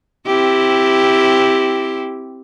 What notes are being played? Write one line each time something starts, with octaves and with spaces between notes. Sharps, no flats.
C4 E4 G4